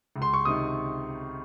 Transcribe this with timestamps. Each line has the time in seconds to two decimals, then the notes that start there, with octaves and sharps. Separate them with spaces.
0.16 C#2
0.22 C6
0.33 C#6
0.45 C3 D#3 D#6